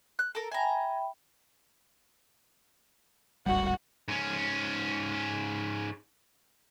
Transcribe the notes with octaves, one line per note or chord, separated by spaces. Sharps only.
F#6
A4 A#4
E5 G5 G#5 A#5 B5
D1 G#1 G3 F#4 F#5
G#2 C#4